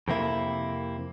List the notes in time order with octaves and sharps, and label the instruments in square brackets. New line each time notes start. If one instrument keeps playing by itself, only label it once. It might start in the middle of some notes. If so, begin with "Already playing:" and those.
[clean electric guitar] F2 C3 A#3 E4